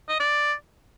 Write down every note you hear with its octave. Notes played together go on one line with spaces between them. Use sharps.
D#5
D5